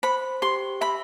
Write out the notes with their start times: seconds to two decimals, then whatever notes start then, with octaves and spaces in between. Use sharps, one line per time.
0.03 C5 B5
0.42 G4 C6
0.81 E5 B5